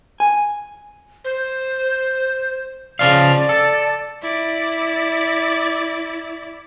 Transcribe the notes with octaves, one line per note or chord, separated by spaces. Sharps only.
G#5
C5
C#3 F3 D5 F5
A4
E4 D5